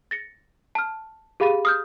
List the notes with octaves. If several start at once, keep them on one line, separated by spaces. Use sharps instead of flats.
A6 A#6 C#7
A5 F6
G4 G#4 F5 B5 A6 D#7
D#6 F6 G6